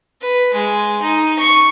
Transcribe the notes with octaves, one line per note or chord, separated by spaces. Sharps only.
B4
G#3
D#4
C#6